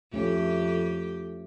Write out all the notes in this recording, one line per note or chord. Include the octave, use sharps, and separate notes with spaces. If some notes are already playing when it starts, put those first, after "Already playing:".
F2 A3 C#4 G4